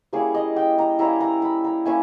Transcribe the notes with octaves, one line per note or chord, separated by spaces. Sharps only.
G3 A#3 C#4 E4 G#4
D#5
G5
A#5
G3 A#3 C#4 E4 A#5
A#5
B5
A#5
A#3 C#4 E4 G#5